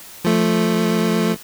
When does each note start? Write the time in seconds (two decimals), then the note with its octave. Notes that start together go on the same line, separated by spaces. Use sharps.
0.25 F3 A3